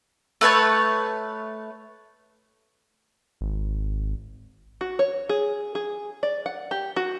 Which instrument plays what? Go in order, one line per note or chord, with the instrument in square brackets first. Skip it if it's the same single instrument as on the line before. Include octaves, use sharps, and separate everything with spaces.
[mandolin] A3 B4 C#5 A5
[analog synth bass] G#1
[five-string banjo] F#4
C#5
G#4
G#4
D5
F#5
G4
F#4